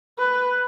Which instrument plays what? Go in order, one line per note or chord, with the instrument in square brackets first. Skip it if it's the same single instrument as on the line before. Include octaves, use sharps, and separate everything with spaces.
[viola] B4